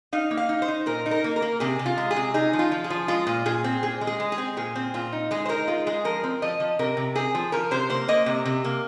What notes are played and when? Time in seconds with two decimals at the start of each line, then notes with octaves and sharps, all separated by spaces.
0.13 D#4 F5
0.31 A#3
0.37 F5
0.49 D#4
0.62 C5
0.68 D#4
0.86 A#2 A#4
1.06 D#4
1.11 A#4
1.24 A#3
1.36 A#4
1.42 A#3
1.60 C3 G#4
1.79 C3
1.86 F4
1.97 G#3
2.11 G#4
2.16 C3
2.34 D#4 G#4
2.53 F3
2.59 F4
2.72 F3
2.84 G#4
2.90 F3
3.08 G#3 F4
3.27 A#2
3.46 A#2 G#4
3.64 C4
3.83 A#2 G#4
4.01 G#3
4.07 G#4
4.20 G#3
4.32 G#4
4.38 C4
4.57 A#2 G#4
4.76 C4
4.94 A#2 F4
5.12 D#4
5.31 G#3 G#4
5.45 C5
5.49 D#4 A#4
5.68 G#3 F4
5.86 G#3 G#4
6.05 F3 A#4
6.24 C4
6.42 F3 D#5
6.60 F3
6.79 C3 A#4
6.97 C3
7.15 C4 G#4
7.35 F3
7.52 F3 A#4
7.71 C3 C5
7.89 A#3 C5
8.08 A#3 D#5
8.26 C3
8.45 C3
8.64 A#3